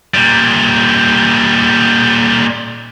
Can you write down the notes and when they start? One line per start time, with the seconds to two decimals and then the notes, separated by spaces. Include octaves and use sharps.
0.14 A#2 G3